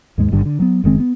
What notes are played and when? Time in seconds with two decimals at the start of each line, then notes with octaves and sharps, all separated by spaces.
0.18 D#2 G#2 G#3
0.32 G1 G2 D3
0.46 D3
0.60 F#3 B3
0.84 F#1 D#3 G#3 C4
1.00 B3